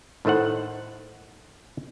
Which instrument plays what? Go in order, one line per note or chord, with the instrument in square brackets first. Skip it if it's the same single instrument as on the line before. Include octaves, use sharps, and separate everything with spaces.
[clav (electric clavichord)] A2 D#3 A3 C5 F#5